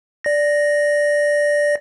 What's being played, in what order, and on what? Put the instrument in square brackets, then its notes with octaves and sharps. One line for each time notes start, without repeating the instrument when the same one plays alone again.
[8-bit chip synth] D5 A#6